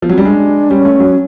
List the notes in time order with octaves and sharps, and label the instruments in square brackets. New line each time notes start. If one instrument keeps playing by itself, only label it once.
[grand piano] F3 [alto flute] B3
[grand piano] F#3 [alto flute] C4
[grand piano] G3 [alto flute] C#4
[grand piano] G#3 [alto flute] D4
[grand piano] G3 [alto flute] C#4
[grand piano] A3
F#3